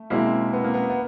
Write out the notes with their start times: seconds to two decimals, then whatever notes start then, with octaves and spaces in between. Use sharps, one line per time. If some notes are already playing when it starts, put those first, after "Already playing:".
Already playing: A3
0.10 B2 G#3 A#3 C4 E4
0.53 B3
0.64 A#3
0.74 B3
0.90 B3